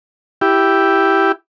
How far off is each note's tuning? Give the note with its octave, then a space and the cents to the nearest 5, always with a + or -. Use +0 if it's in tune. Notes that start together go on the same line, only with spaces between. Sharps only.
E4 +0 G4 +0